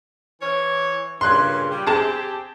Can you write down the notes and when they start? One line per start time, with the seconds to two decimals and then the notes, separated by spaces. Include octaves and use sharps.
0.41 E3 C#5
1.21 G2 A#2 C#3 C6 F#6 G#6
1.70 G3
1.87 C4 G4 G#4 G#5 A5